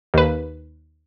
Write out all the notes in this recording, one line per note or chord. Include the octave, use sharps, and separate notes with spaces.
D#2 B4